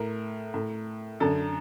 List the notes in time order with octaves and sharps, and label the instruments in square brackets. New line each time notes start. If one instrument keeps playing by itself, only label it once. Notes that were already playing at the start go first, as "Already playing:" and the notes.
Already playing: [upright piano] A2 A#4
A2
F#2 D3 A4